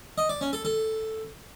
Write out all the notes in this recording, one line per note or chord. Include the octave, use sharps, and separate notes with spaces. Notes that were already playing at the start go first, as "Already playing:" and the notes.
D#5
D5
C#4
A4
A4